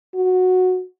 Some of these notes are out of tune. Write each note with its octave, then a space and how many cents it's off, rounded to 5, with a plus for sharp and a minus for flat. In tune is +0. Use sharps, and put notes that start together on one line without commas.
F#4 -10